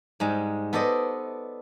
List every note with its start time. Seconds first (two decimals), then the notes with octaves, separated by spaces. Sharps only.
0.20 G#2 G3 G#3
0.73 B3 A4 C5 D5 D#5